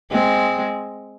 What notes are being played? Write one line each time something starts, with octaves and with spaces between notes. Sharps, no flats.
G#3 C4